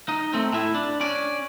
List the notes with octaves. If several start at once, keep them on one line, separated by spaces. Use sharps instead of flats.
D#4
A3 C4
A2 E4
D4
C#4 D5